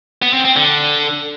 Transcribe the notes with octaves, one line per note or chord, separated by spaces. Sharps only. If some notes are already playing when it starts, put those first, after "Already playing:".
B3
C4
C4
D3